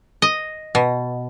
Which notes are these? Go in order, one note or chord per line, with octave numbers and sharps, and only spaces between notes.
D#5
B2